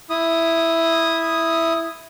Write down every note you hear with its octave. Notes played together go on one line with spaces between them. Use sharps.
E4 D#6